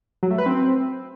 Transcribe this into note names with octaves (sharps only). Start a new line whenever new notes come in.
F#3
A3
B4
C4